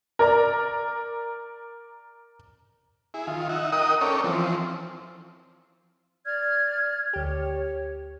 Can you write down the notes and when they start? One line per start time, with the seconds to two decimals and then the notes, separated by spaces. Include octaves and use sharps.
0.19 A#4 D5 A#5
3.14 E4 G#4
3.27 D#3 F4
3.49 D#4 E5 F#5
3.72 D#4 A#4 D#5 F#5 G5 D#6
4.01 C#4 A4 A#4 C#5 D5 G5
4.24 E3 F3 C4
6.25 D5 F6 G#6
7.13 D2 G4 C#5